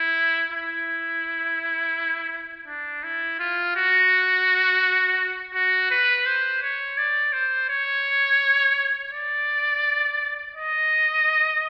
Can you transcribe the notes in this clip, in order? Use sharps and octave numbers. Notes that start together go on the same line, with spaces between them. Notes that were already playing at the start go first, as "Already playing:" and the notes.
Already playing: E4
E4
D4
E4
F4
F#4
F#4
B4
C5
C#5
D5
C5
C#5
D5
D#5